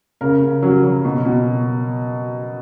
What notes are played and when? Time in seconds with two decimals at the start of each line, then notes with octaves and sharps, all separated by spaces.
0.21 C#3 A#4
0.42 C#3
0.63 F#3
0.83 F#3
1.05 B2
1.25 B2